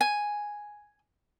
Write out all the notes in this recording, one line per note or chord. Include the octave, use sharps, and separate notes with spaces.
G#5